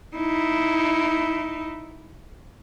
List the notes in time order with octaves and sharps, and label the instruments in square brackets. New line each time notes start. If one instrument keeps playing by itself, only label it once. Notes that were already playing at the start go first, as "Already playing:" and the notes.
[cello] D#4 E4